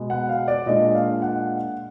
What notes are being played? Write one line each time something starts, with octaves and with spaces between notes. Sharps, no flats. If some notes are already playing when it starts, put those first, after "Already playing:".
Already playing: B2 G#3 B3
F#5
F5
D5
A#2 G#3 D4 D#5
F5
F#5